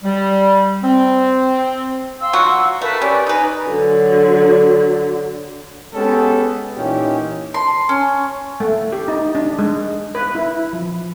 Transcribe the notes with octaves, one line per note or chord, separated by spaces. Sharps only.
G3
C4
F5 C6 E6
F#3 F4 F#4
A3 A#4 B4 A5
C#4 G4 D5
D#4 B4 G#5 A#5
D3 F#3
G#3 B3 C#4 G4 A4
A#2 E3 C#4 D#4 G4
C6
C#4
A3
G4
D#4
D4
G#3
B4
E4
F3